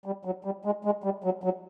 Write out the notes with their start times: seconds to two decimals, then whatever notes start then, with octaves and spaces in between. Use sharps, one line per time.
0.06 G3
0.25 F#3
0.45 G3
0.65 G#3
0.85 G#3
1.04 G3
1.24 F#3
1.44 F#3